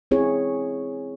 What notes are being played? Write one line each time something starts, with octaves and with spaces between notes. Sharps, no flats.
C4 E4 G#4 C#5